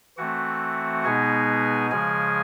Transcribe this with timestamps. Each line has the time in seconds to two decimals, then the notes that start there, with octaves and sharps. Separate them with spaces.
0.18 E3 A3 C4 F#4 F#5
1.04 B2 G#3 B3 D#4 G#4 G#5
1.90 C#3 F3 G#3 G#4 G#5